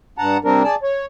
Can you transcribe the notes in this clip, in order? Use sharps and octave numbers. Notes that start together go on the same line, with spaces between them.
G2 F#5 A5 A#5
C3 G3 C4 D4 A#4
G#4 D5 A5
C#5